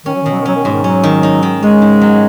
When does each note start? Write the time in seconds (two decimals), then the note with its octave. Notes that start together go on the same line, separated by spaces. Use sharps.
0.06 D#3 C#4
0.14 F#3
0.22 D#3
0.26 B2
0.31 F#3
0.39 D#3
0.46 F#3 C#4
0.55 D#3
0.64 G#2 F#3
0.72 D#3
0.84 F#3 C#4
1.04 D#3
1.23 D#4
1.43 D#3
1.62 G#3 C#4
1.82 G#2
2.01 F#3